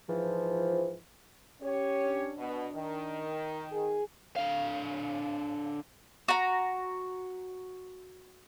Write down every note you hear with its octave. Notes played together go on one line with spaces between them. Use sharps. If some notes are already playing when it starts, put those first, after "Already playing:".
G#2 E3 F3
C#4 G4 C#5
D4
B2
D#3
G#4
D3 F5
F#4 A#5